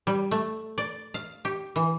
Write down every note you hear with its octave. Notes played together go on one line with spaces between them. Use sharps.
G3
A3
D5
F5
G4
E3